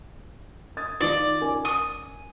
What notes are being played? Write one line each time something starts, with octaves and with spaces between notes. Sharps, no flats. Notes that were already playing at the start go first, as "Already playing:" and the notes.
D#6 G#6 A6
D#3 D#4 F4 D5
C#4 A#4 G#5
D#6